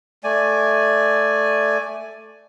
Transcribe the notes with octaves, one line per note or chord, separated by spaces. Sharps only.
A3 D5 G#5